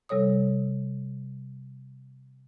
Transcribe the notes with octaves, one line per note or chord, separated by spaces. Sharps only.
C3 G3 A4 C#5 D#6